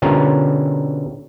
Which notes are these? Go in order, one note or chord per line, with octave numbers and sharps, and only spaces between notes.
B2 D3 C#4 F4 G4 A#4